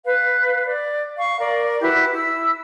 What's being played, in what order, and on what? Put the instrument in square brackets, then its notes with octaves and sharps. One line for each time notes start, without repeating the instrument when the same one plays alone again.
[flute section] B4 F5
D5
F5 C#6
A#4 D5
E4 F#4 G4 B4
E4 E6